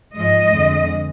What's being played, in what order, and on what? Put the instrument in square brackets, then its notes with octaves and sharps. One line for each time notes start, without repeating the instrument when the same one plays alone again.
[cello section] G#2 F3 G#3 D#5
F2 D3 G#3